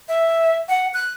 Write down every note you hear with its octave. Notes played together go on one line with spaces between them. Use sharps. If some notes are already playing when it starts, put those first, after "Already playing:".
E5
F#5
F#6